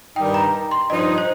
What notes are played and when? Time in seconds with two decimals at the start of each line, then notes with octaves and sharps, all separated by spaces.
0.16 G2 D#3 G3 D#4 G5
0.34 A#5
0.71 C6
0.90 G2 F3 D#4 D#5
0.99 C5
1.18 C5